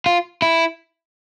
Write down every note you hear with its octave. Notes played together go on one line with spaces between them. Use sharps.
F4
E4